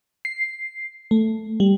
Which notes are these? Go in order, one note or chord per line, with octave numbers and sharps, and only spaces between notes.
C7
A3
G3